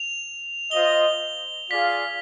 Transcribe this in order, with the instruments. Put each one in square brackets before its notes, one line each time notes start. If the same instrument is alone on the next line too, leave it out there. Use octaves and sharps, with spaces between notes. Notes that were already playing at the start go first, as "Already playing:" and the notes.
Already playing: [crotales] F7
[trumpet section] F4 C5 D#5 [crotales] G7
[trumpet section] F4 G#4 D5 F5 [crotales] B6